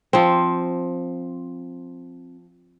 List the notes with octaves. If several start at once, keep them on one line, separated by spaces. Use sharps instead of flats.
F3 C4